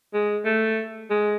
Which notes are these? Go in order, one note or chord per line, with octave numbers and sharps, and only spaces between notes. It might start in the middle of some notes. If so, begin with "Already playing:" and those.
G#3
A3
G#3